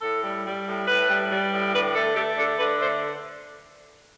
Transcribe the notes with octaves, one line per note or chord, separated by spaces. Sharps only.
A2 A4
G3
G3
A2
A2 B4
G3
G3
A2
D3 B4
A3 A4
A3 G4
D3 A4
D3 B4
A3 C5